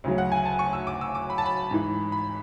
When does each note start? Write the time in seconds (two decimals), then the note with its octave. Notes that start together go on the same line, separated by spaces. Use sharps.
0.04 D2 C#3 F#3
0.18 F#5
0.32 G#5
0.45 A5
0.59 C#6
0.73 E6
0.87 D6
1.01 E6
1.15 D6
1.30 B5
1.38 A5
1.46 B5
1.71 G#2 E3
2.12 B5